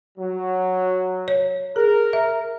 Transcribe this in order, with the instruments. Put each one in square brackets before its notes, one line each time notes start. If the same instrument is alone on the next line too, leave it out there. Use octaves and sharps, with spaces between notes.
[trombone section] F#3
[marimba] C#5
[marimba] G#4 [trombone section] A#4
[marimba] E5